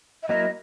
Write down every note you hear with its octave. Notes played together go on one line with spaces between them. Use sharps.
E5
F#3 A#3 E4 A#4 D#5